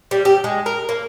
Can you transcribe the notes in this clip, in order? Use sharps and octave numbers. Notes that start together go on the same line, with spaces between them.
G3
G4
G#3
A#4
A#3